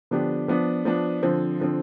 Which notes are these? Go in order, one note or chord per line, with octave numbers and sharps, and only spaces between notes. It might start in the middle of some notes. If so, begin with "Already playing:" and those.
D3 F3 B3 D4 G4
F3 B3 D4
F3 B3 D4
D3 F3 C4
D3 F3 C4